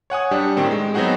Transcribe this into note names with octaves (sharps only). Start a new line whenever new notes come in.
C#5 F#5 G#5 D#6
G3 D4 G4
A2 D#3 C4 G4
G#3
F#3 B3 C4 D#4 F#4 G#4